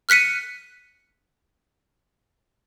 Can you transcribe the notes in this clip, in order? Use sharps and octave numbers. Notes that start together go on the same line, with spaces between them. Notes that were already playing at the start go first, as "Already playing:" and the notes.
F6 F#6 B6 C#7 D#7